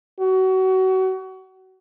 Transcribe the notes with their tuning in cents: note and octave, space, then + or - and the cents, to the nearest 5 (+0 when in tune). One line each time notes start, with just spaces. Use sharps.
F#4 +30